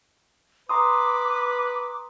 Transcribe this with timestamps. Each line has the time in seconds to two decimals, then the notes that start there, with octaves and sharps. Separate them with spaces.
0.69 B4 A#5 C6 D6 D#6